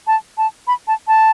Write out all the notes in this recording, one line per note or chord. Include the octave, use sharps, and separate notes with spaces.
A5
A5
B5
A5
A5